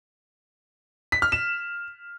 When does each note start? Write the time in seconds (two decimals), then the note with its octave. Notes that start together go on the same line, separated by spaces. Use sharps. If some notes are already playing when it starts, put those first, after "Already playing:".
1.12 B6
1.22 F6
1.32 E7